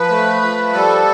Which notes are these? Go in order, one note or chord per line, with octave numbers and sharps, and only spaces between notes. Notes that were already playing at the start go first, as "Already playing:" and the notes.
Already playing: F3 B4
A3
F3
G3 A4